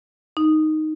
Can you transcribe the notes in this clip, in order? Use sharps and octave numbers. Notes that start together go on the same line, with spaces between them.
D#4